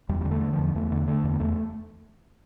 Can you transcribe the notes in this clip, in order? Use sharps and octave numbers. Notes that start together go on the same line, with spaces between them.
E2 G3
D3 G3
A3
D3
F3
E2
E2 A3
D3
D3 A3
E2
A#3
E2 A3